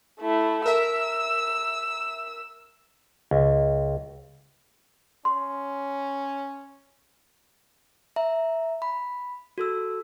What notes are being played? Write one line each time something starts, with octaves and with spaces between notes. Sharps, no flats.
A3 E4
A#4 E5 E6
C#2
C#4 C6
E5 A#5
B5
F#4 A4 E6